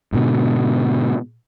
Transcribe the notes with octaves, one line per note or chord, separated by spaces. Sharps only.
G#2 B2 D3